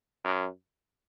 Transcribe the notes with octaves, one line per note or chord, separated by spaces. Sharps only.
F#2